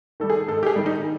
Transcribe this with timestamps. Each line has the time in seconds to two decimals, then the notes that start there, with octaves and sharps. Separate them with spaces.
0.20 D#3 G3 A4
0.30 G#4
0.48 G#2 A4
0.63 G4
0.66 G#4
0.76 D#3 G3
0.86 D#4